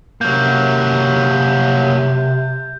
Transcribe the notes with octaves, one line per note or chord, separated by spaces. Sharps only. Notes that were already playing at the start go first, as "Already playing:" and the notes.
C3 F#3 A#3 G6